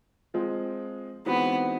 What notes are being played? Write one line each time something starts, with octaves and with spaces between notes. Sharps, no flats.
F3 G#3 C4 F4
E3 G#3 B3 C4 D#4 F#4